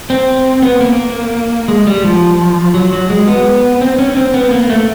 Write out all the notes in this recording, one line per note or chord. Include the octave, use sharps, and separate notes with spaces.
C4
B3
A#3
G#3
G3
F3
F#3
F#3
G#3
B3
C4
C#4
C4
B3
A#3
A3